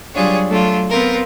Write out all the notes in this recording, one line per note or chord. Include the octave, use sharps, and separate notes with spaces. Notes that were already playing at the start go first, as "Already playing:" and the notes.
F#3 G3 D4 F4 G#4 C#5
F#3 A3 D4 F4
B3 C4 F4 A#4